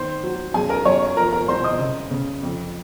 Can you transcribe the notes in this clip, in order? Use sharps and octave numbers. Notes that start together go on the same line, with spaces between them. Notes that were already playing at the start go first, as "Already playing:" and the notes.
Already playing: D#3 C5 C6
F#3
F#2 G#4 G#5
A#4 A#5
F#2 C#5 C#6
F3 A#4 A#5
A#4 A#5
C2 C5 C6
D#5 D#6
C#3
C#3
F2